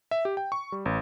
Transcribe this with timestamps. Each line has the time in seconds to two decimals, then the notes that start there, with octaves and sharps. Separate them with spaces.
0.11 E5
0.25 G4
0.37 G5
0.52 C#6
0.72 G3
0.85 A1